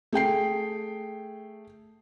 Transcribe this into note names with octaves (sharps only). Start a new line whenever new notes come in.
A3 G#4 G5 C7